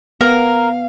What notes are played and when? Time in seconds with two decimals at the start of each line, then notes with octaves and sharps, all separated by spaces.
0.21 B3 A#4 F5